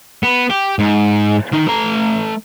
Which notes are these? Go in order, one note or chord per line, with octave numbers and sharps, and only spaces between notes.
B3
G4
G#2
D#3 D#4
A3 A#5